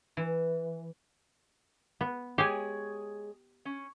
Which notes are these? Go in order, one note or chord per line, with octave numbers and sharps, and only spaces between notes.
E3
B3
G#3 G4 G#4 C#5 G#5
C#4